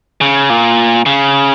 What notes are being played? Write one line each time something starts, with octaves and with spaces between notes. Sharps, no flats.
C#3
A#2
C#3